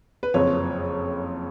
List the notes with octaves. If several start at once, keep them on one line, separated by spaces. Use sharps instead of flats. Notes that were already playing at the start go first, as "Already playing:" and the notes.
B4
F#1 F2 F3 C#5